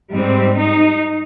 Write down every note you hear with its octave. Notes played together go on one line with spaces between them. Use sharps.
G#2 G3 C4
D#4